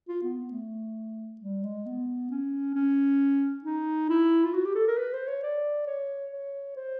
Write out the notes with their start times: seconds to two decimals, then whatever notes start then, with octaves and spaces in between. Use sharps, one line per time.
0.08 F4
0.23 B3
0.38 B3
0.52 A3
1.41 G3
1.63 G#3
1.86 B3
2.30 C#4
2.75 C#4
3.64 D#4
4.09 E4
4.45 F4
4.54 F#4
4.65 G4
4.75 A4
4.87 A#4
4.97 B4
5.13 C5
5.28 C#5
5.43 D5
5.86 C#5
6.32 C#5
6.76 C5